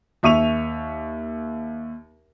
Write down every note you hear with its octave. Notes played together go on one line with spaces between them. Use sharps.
D#2 E5 C#6 D#7 F7